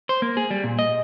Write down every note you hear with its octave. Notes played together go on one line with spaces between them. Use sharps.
C5
A#3
G#4
G3
A#2
D#5